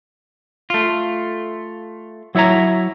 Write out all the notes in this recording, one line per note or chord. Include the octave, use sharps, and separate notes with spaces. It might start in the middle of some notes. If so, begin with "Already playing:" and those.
A3 F4
F#3 E4 C#5 E5 A#5